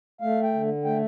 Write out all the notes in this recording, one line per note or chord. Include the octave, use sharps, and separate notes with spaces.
A3 F5
G5
D3
A3 G5